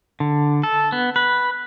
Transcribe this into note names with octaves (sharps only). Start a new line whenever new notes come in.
D3
A4
B3
B4